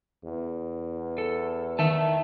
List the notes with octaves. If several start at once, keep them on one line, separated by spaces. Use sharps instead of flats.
E2
A4
D#3 E5 A5